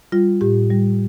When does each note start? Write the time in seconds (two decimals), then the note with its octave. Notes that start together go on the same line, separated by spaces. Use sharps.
0.12 G3 F4
0.41 A2 G4
0.70 G3